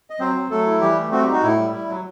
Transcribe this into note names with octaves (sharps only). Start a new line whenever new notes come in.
D#5
F#3 C4 C5
F#3
F#3 A3 A4
E4
E3 G3 G4
A3
C4 F#4
G3 G4
D#4
F#4
A2 E4
G3
E4
F#3